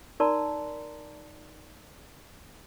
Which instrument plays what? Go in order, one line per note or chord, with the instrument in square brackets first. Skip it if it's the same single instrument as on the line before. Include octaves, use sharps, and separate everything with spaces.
[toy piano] D#4 A#4 D5 A5 A#5 C6